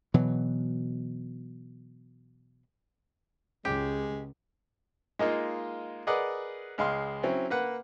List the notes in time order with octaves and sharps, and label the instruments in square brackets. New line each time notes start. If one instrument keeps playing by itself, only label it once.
[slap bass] B2 E3 F#3
[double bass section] C#2 [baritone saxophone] G#3 [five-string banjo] G4
[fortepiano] G#3 A#3 D#4 F4
G#4 A#4 B4 D5 D#5 F#5
C#2 G#3 F5 C6 F6
F#3 C4 C#4 E4
A#3 B4 F#5